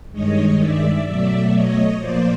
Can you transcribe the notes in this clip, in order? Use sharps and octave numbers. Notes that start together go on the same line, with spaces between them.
G2 D#3 G#3 C#5 D#5
D5 E5
B2 F#3 A3 D5 E5
C#5 D#5
A#2 F3 A#3 C5 D5